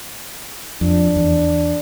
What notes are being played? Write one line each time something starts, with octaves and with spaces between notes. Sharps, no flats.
F2 D4
E2